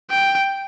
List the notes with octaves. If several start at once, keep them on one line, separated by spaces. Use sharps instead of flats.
G5